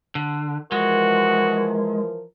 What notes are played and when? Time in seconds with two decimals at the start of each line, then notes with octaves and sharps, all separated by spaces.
0.15 D3
0.72 E3 F3 G#3 F#4 A#4